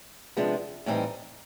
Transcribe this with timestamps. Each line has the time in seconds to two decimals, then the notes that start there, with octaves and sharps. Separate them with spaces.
0.37 C3 F3 G#3 B3 D4
0.86 A2 E3 G3 C4 D#4